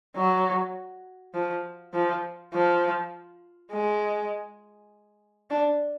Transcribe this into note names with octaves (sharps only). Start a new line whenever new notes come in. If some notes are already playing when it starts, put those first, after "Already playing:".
F#3
F3
F3
F3
G#3
D4